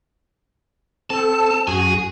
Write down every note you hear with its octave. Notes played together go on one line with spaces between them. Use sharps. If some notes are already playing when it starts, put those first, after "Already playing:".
C4 A4 A5
F#2 F#4 G#4 G#5